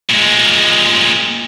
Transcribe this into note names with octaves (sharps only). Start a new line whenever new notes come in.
A#2 G#3